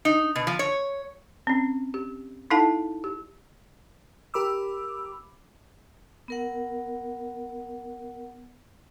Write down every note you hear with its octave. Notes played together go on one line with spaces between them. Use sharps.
D#4
B2
F3
C#5
C4 C#4
G4
D#4 E4 A4 F5 F#5 A5
G4
G4 A#4 B5 D6 E6
B3 A#4 F#5